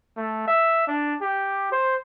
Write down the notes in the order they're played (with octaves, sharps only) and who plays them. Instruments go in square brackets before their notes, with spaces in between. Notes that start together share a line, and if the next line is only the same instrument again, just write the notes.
[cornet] A3
E5
D4
G4
C5